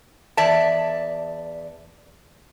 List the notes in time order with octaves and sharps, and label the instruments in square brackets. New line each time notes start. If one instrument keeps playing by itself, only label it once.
[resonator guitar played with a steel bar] E2 D5 E5 A5